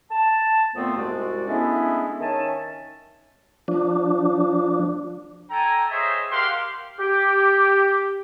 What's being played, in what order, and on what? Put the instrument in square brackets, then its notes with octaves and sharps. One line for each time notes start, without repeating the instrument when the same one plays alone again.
[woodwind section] A5
F2 A#2 A3 B3 C4
C2 G#2 G#3 F#4 D5
G#3 A3 B3 C#4 D4 E4
D#3 C#4 E5 G#5 A5
[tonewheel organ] F3 D4
[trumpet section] A4 G5 G#5 A#5
G#4 C5 C#5 D#5 E5
G4 A#4 F5 F#5 C6
[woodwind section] G4